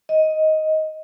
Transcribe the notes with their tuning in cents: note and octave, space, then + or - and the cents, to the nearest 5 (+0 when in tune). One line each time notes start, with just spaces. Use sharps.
D#5 +10